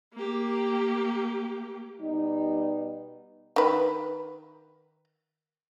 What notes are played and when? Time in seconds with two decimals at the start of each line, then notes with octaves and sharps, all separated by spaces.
0.14 A#3 G4
2.01 B2 G3 D#4
3.56 D#3 B4